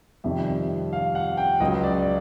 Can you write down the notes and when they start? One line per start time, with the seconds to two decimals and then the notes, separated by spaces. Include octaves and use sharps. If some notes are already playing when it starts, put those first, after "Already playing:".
0.24 F2 C3 D#3 G3 E5
0.93 F5
1.15 F#5
1.37 G5
1.60 C#2 C#3 F#3 D#5
1.83 D5